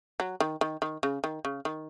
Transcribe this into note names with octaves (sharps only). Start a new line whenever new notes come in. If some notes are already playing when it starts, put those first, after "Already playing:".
F#3
D#3
D#3
D#3
C#3
D#3
C#3
D#3